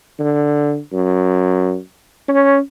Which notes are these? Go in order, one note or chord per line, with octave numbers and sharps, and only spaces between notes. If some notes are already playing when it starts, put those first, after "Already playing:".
D3
F#2
C#4